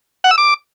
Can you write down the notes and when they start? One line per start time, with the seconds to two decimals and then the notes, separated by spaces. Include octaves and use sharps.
0.24 F#5
0.31 E6
0.38 D6